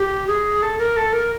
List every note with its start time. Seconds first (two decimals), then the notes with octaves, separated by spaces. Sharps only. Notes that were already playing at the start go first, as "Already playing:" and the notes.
Already playing: G4
0.27 G#4
0.63 A4
0.78 A#4
0.97 A4
1.13 A#4